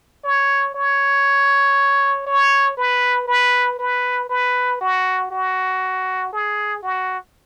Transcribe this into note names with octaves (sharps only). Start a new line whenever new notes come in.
C#5
C#5
C#5
B4
B4
B4
B4
F#4
F#4
G#4
F#4